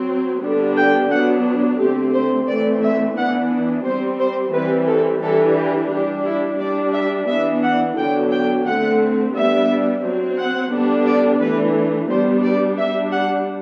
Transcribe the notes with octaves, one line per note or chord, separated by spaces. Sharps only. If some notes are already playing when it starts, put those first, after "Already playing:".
Already playing: F#3 C4
D3 G3 B3 D4
G5
F#3 B3 D4 F#5
D3 A3 C4 G4
C5
E3 A3 C4 D5
E5
E3 B3 D4 F#5
G3 C4 C5
C5
E3 G3 C4 B4
A4
E3 G3 D4 A4
G4
G3 D4 G4
E4
G3 D4 D5
E5
E3 B3 D4 E5
F#5
D3 F#3 B3 D4 G5
G5
D3 A3 C4 F#5
G3 B3 D4 E5
F#3 C4
F#5
D3 G3 B3 D4
D5
E3 A3 D4 B4
G3 B3 D4 C5
D5
G3 D4 E5
F#5